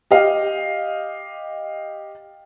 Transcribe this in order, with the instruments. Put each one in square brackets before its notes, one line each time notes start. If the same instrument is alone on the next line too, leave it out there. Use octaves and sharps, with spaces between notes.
[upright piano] G4 D#5 F5